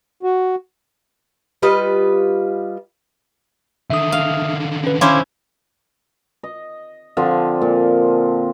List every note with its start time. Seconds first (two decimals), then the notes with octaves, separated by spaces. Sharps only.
0.23 F#4
1.62 G3 F4 B4 D#5
3.90 D3 D#3 E5 D#6
4.12 F5
4.84 C#4 B4
5.01 C#4 E4 C5 F5 C6 D6
6.43 D#5
7.17 D3 F3 C4
7.61 A#2